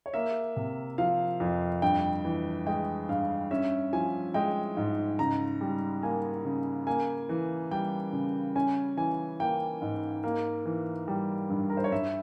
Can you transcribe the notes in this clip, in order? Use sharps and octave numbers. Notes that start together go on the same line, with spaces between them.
C#5
A#3 E5
C3
F3 F5
F2
G2 G5
E3
G#3 G5
G2 F5
C#4 E5
F3 G#5
G#3 G5
G#2
C#3 A#5
G3
A#3 G#5
C#3
A#3 G#5
E3
G3 G5
C#3
C#4 G#5
E3 G#5
A#3 G5
G#2
A#3
E3
G3
G2
A#4
C5
C#5
G2 E5